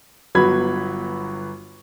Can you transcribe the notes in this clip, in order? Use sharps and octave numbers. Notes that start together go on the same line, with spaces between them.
G1 F#3 B3 F#4 B5 G#6